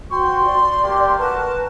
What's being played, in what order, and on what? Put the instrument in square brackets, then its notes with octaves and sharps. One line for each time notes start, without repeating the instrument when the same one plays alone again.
[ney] F#4 [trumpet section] C5 G5 C#6 [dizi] C6
[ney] D5
[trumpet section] A#3 G4
[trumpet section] F#4 A#4 [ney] B4 [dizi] A5